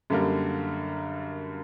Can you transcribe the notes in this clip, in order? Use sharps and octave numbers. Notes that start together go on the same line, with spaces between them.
F#2 D3 G3 A#3